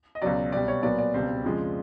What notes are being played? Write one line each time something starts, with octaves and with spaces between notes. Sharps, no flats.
D#5
C#2 B2 F#3 D5
C2 B2 G3 D5
C#5
A#2 F#3 B3 D5
D5
C#2 B2 G3 C4
F2 C#3 F3 G#3